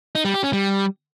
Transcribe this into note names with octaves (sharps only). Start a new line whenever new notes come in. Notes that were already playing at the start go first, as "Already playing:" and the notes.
D#4
G3
G4
C#4
G3